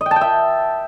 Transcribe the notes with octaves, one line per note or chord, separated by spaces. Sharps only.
D#5
G5
A5
G5
E5